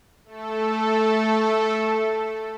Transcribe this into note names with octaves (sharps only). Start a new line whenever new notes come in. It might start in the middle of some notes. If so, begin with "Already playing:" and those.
A3 A4